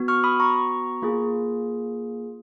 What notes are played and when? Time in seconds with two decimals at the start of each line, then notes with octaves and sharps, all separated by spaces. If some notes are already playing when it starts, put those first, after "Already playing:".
Already playing: B3 F#4
0.08 C#6 F6
0.24 B5 D#6
0.40 A#5 C#6
1.02 A#3 F4 G#4